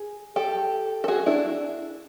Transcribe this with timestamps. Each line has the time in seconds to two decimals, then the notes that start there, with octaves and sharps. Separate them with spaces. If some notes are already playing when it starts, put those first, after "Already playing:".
Already playing: G#4
0.36 G4 A4
1.04 A4
1.08 F#4 G#4
1.26 D4 E4